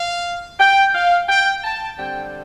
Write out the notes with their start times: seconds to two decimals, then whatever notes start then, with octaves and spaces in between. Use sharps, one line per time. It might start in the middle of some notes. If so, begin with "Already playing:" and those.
Already playing: F5
0.60 G5
0.94 F5
1.29 G5
1.64 A5
1.99 D3 G3 C4 G5